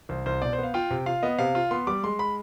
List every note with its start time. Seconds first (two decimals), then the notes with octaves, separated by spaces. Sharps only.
0.09 C2 C5
0.26 C2 C5
0.42 B2 D5
0.53 C5
0.58 B3
0.63 F5
0.74 F4 G5
0.90 C3
1.06 F4 F5
1.23 B3 D#5
1.38 C3 F5
1.55 F4
1.71 B3 C6
1.87 G3 D6
2.03 G#3 C6
2.19 B5